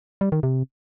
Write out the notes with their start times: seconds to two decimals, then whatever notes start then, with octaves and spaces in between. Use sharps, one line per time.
0.21 G3
0.32 D#3
0.43 C3